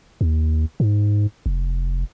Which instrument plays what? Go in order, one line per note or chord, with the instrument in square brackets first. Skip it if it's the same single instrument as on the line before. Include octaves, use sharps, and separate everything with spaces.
[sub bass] D#2
G#2
F1